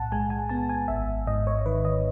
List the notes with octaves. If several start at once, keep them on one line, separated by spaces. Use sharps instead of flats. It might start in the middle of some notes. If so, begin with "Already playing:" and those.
Already playing: B1 A2 F#5 A5
G#3 G#5
G#5
B3 A5
G#5
G#1 E5
G#2 D#5
C#5
D#3 B4
D#5